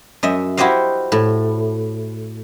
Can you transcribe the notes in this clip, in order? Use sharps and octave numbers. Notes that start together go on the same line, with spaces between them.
F#2 D#5 E5
E4 F#4 G4 C5 D#5 F5
A2